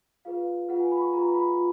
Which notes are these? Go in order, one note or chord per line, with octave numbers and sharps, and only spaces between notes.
F4 G#4 B4 F5
F4 G#4 B4 F#5
G#5
B5
C#6
F4 G#4 B4 A#5
B5
F4